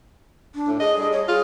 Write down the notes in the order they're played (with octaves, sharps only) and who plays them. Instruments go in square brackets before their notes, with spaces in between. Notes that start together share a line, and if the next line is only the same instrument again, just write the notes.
[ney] D4
[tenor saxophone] A2
[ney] G#4 [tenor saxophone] D#5
[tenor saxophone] G3
[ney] C#5
[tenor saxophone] F4 [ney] G#4